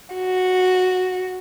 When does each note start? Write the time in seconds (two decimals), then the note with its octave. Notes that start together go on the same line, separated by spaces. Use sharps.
0.15 F#4